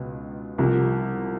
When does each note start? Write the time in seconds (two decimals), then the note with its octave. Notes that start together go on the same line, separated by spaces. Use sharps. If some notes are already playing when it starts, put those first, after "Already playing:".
Already playing: C#2 B2 B3
0.58 C2 C3 F3